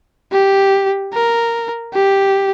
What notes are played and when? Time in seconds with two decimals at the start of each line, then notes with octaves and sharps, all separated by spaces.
0.32 G4
1.13 A#4
1.94 G4